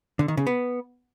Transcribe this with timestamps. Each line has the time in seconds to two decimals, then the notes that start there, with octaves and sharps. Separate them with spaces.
0.19 D3
0.28 D#3
0.37 C#3
0.47 B3